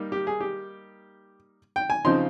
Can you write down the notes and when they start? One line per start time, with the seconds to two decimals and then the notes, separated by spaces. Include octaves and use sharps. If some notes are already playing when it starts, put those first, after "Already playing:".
Already playing: G3 A#3 D#4
0.12 G4
0.27 G#4
0.40 G4
1.76 G5
1.90 G#5
2.05 C#3 F3 C4 D#4 C6